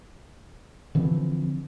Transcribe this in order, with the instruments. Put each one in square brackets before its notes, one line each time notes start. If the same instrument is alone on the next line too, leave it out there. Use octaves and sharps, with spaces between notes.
[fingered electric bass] D3 E3 F3 C4